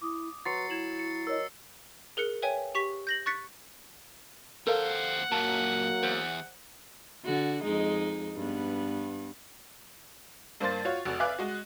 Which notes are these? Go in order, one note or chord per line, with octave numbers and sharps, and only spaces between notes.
E4 D6 D#6
F#3 B4 C6 A6 C7 C#7
E4 G#6 E7 F#7
C#7
A#4 C#5 D#5 E6
G#4 A#4 F#6 C#7
B4 C#5 E5 G5 G#5
G4 C#6 B6
G6 A#6 F#7
C#6 F#6 A6 B6 C#7
D#2 A4 A#4 C5 F5 F#5
F#2 A#2 F#3 A#3 A5
E2 C5
D3 F#4
F2 G#3 D#4
G2 B3
G2 A#3 C5 C6 A6
F4 F#4 C#5
F1 F#4
B4 E5 F5 G#5 D6 F#6
G#3 F#4